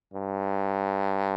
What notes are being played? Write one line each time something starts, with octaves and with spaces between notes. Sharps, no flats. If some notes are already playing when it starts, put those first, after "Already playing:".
G2